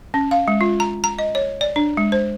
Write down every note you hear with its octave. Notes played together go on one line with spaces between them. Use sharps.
C#4
F5
G#3
F4
A#5
A#5
D#5
C#5
D5
D4
G#3
C5